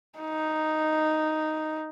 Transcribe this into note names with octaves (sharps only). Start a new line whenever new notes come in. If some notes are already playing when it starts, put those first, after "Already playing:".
D#4